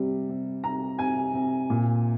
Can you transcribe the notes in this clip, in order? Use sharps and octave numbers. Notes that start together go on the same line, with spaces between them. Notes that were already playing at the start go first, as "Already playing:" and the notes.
Already playing: C3 G3
C3
C3 A#5
C3 G#5
C3
A#2